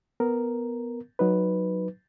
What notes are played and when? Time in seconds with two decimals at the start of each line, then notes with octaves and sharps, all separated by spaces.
0.20 B3 A#4
1.19 F#3 D#4 B4